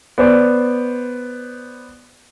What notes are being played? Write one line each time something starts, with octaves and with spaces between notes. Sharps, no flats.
B3 C5 D5